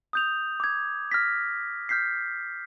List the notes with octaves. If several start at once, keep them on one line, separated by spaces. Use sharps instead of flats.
D#6 G6 F7
D6 G#6
F6 A#6 B6
F6 G6 B6 C7